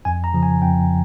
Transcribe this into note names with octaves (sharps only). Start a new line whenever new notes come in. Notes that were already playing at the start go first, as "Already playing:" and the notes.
F2 G#5
A#5
C#3 F3
G#5
F2 G5